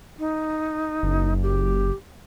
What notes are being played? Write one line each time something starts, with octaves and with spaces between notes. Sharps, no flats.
D#4
F#1
G4